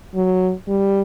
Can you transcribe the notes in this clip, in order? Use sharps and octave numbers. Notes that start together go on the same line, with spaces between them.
F#3
G3